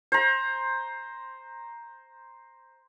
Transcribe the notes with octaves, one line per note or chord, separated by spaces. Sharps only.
C5 A#5